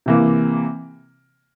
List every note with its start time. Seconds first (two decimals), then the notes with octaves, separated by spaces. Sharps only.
0.06 C3 E3 A#3